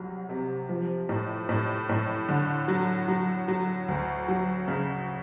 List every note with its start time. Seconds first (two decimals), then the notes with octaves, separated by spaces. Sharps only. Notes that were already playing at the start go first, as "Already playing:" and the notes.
Already playing: C2 F#3
0.29 C3
0.69 F3
1.09 A2
1.49 A2
1.89 A2
2.29 D3
2.68 F#3
3.08 F#3
3.48 F#3
3.88 D2
4.28 F#3
4.68 C#3